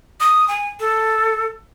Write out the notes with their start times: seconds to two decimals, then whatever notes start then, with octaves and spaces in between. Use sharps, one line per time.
0.20 D#6
0.48 G#5
0.80 A4